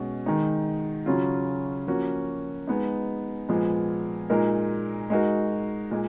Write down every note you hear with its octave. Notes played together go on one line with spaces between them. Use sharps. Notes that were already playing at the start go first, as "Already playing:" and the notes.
Already playing: B2 G#3 C#4
D#3 G#3 D#4
C#3 F#3 C#4 F4
F3 A#3 C#4 F#4
G#3 B3 D#4
A#2 F3 G#3 B3
A#2 G#3 D#4 A#4
G#3 D#4 F#4 A#4
A#2 G#3